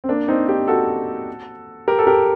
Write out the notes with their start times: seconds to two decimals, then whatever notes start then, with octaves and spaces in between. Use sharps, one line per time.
0.04 C4
0.09 A#3 D4
0.28 C4 D#4
0.48 D#4 G4
0.68 F#4 A4
1.88 G4 A#4
1.99 A4
2.07 G4 A#4